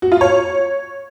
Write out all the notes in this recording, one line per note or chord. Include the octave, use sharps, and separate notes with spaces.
F#4
F4
C#5